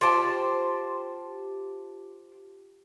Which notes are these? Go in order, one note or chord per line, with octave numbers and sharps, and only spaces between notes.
F4 G4 C5 A5